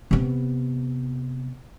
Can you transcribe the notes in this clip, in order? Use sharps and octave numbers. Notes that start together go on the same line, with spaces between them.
C3 B3